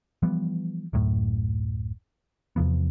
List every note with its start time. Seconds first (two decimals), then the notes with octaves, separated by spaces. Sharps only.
0.23 E3 F3 G3 B3
0.93 D1 F#2 A2
2.56 E2 C3 F3 B3